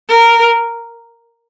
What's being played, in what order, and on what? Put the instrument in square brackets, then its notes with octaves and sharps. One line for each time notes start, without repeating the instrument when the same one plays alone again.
[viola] A#4